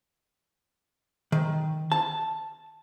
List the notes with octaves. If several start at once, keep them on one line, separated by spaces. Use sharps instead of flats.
D#3
A5